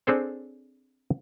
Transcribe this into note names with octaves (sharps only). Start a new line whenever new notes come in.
C4 D4 G#4 A4 C5 C#5